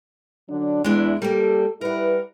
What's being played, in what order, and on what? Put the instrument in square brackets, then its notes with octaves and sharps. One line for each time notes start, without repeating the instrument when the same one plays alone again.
[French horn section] D3 F#3 D4
[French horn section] E2 E4 [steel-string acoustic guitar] G#3 D4
[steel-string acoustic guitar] G3 A#3 [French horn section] G4 A4
[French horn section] G3 E4 B4 [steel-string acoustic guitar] A#4 F#5